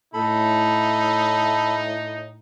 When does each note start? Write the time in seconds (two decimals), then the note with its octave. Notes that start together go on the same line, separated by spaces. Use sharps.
0.14 A2 D#4 A4 B5